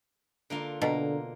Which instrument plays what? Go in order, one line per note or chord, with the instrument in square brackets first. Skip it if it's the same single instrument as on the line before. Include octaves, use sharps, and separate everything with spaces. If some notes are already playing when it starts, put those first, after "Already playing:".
[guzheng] D3 A#3 F4
[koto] B2 [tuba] D3 [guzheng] A#3